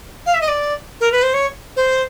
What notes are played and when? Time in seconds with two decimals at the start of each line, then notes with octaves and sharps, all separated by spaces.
0.26 F5
0.34 E5
0.41 D#5
0.48 D5
1.01 A#4
1.12 B4
1.23 C5
1.34 C#5
1.76 C5